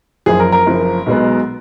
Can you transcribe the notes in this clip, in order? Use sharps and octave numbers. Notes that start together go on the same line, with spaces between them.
F#1 F#2 F3 G#4
A#4
A#4
F#1 F#2 F3
B1 B2 G#3 B3